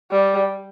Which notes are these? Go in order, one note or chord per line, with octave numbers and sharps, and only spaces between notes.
G3